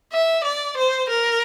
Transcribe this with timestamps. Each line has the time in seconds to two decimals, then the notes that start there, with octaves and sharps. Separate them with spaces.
0.13 E5
0.44 D5
0.77 C5
1.09 A#4